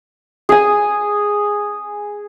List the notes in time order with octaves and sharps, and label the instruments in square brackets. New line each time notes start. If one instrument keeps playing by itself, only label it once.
[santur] G#4 G#5